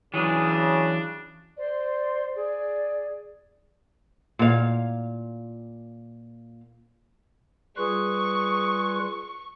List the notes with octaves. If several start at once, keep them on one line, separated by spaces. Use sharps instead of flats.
C#3 E3 F#3 D4 G#4
C5 D5 C6
G#4 D5
A#2 F5
G3 F4 G#4 B4 C#6